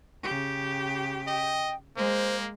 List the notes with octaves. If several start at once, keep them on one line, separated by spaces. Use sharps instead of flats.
C#3 G4
D#5 G5
G#3 A#3 C5